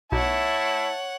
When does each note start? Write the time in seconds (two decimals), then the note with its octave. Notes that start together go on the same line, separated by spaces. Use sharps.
0.12 B1 E4 C#5 E5 F#5 A5